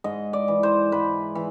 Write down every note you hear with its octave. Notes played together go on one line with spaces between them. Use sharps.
G#2 D#5
D5
E3
C5
G#2 B4
E3